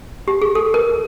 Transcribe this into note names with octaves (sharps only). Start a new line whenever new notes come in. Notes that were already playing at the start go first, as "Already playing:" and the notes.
G4
G#4
A4
A#4